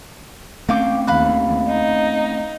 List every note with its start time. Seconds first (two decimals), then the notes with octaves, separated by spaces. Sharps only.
0.69 A3 C4 C#4 F5 G5 D6
1.07 D#2 F5 B5 F#6
1.67 D#4